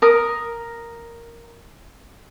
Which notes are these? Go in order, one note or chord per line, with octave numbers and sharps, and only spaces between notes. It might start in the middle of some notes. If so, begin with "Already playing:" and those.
A#4 D#6